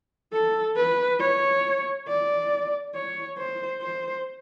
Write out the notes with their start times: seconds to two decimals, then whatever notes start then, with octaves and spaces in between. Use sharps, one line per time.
0.33 A4
0.77 B4
1.20 C#5
2.08 D5
2.95 C#5
3.38 C5
3.82 C5